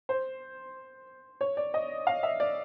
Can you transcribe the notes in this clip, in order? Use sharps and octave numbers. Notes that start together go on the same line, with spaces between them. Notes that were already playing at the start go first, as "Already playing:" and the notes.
C5
C#5
D5
D#5
F5
E5
D5